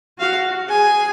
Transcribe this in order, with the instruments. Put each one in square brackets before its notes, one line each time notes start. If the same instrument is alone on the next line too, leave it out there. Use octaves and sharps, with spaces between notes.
[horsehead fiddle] F#4 [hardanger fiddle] F5
[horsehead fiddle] G#4 [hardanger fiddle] G#5